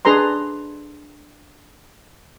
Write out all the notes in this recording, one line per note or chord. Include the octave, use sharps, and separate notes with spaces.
D4 G#4 B4 A#5 C6